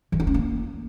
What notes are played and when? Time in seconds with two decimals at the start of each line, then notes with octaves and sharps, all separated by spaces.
0.12 E3
0.20 E4
0.27 C#4
0.34 A#3